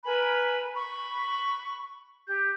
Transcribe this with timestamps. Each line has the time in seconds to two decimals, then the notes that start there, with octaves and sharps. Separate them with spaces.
0.04 A#4 B4 G#5 B5
0.75 B5 C#6
2.28 G4 G6